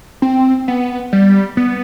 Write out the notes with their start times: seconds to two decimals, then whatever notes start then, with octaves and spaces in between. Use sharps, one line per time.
0.22 C4
0.68 B3
1.13 G3
1.57 B3